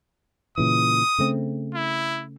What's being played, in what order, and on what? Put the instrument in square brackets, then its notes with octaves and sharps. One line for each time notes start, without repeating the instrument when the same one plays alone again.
[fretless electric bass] A#2 C#3 E3 [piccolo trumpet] D#6
[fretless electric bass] C#3 A3 C4
[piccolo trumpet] E4